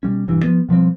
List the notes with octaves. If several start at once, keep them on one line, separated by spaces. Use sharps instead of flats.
B2 G3 C#4
E1 G2 E3
F3 B3
B2 F3 G3 C4